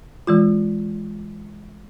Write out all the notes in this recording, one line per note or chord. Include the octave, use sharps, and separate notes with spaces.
E3 G#3 F4